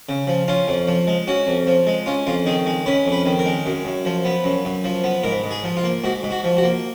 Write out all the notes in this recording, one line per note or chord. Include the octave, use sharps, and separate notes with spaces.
C#3
F3
C#4 F4
F2
F3
G#3
C#4 F#4
F2
F3
G#3
C#4 F4
F2 F4
D#3 G#4
G#3
C#4 B4
F2
B4
D#3
A#4
G#3
F#2
F#2
F3
B3
F#2
F#2
F3
B3
G#2 A#4
G#2
G#4
F3
F4
A#3
G#2 F#4
G#2
F#4
F3
F#4
A#3